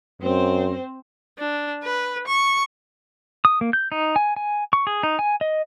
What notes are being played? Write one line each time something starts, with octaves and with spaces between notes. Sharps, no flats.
F#2 C4 C5
D4
B4
C#6
D#6
A#3
G6
D#4
G#5
G#5
C#6
G#4
D#4
G#5
D#5